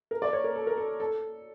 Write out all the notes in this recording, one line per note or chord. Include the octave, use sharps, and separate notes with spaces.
A#4
D5
C#5
A#4
A4
A#4
A4
A4